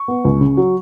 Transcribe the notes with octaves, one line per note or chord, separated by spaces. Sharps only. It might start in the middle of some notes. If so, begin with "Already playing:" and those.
Already playing: C#6
B3
C#2
C#3
F#3